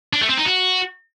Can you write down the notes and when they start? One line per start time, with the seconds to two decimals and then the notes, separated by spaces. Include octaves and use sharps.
0.13 D4
0.21 A3
0.29 C4
0.37 D#4
0.45 F#4